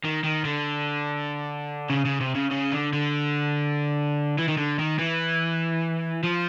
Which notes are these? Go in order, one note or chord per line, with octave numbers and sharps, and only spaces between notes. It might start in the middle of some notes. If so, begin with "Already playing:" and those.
D#3
D#3
D3
C#3
C#3
C3
C#3
C#3
D3
D3
E3
D#3
D3
D#3
E3
F3